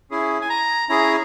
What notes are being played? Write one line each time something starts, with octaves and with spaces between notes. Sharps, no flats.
C#4 E4 G#4
G#5
A#5
C#4 E4 G#4 A#5